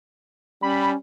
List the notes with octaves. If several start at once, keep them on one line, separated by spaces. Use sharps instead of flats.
G3 C#4 B5